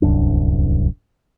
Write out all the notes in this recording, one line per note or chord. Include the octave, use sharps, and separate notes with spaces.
D1 C2 F#2 D4